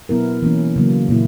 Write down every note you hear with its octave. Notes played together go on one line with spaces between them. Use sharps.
B2 F#3 B3 E4 A#4
E3 A#3 C#4
C#3 F#3 A#3
A#2 A#3 E4